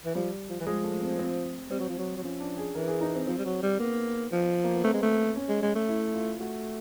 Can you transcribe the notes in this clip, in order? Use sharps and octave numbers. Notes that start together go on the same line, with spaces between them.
E3
F3 G3
F3
E3
F3 G#3
A3
C4
C4
G3 C4
F#3
F3
F#3
F#3
F3 C#4
D4
G#4
E3 A#4
G#4
D#4
C4
F3 C4
G3
F#3
G3
A#3 B3
F3
A#3
B3
A3 C4
G#3
A3
C#4
G#3
G#3
A3
E4
F4
A3 F#4